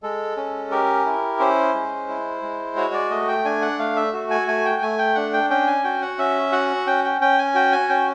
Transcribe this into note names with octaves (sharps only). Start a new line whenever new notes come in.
G#3 A4
C#4
G4 A#4
E4
C#4 C5
G#3
E4
G#3
F#4 C#5
D5
A3 D#5
G5
D4 G#5
F#5
A3 F5
E5
F#4
G#5
A3 G#5
G5
A3 G#5
G5
D4 F#5
G5
C#4 G5
G#5
F#4 G5
F#5
C#4 E5
F#4 F#5
C#4 G5
G5
C#4 G5
G#5
F#4 G5
G#5
C#4 G5